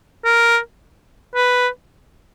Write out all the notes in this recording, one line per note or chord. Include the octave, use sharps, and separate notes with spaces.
A#4
B4